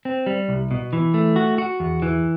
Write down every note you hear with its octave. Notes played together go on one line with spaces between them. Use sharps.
C4
G3
C2
B2
E3
A3
F#4
F#4
E2
E3